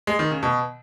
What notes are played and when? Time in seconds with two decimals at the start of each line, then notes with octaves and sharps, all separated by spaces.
0.07 G#3
0.19 D#3
0.31 C#3
0.43 B2